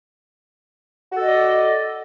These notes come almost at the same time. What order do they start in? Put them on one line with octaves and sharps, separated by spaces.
F#4 A4 D#5 D5